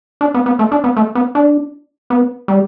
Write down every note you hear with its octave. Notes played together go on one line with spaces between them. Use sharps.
D4
B3
B3
A3
D4
B3
A3
B3
D4
B3
G3